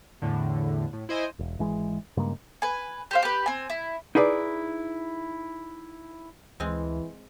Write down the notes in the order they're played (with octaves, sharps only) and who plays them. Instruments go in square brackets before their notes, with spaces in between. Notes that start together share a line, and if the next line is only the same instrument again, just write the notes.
[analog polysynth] E2 A2 D3
A2
E4 C5 D#5 G#5
[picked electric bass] E1
G#1 E3 G#3
G2 C#3 G#3 A#3
[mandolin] B4 G#5
G4 C5 F5
G4 B4
C4 G#5
E4
[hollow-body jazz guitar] D#4 E4 G#4 B4 D5
[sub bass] D2 [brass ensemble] E3 [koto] G#3 C4